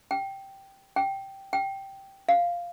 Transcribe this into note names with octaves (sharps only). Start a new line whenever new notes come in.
G5
G5
G5
F5